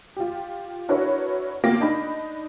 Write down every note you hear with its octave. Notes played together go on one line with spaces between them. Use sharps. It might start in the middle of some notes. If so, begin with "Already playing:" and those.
F4 G4
D4 E4 F#4 A#4 B4 C#5
A#3 F4 G4 A#6
D4 D#4 B5